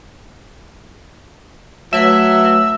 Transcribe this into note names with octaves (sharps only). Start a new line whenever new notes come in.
F#3 A3 B4 E5